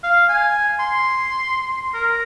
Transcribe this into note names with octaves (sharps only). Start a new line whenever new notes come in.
F5
G#5
C6
A#4